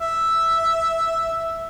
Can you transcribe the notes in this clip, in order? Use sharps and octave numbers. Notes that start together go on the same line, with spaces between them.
E5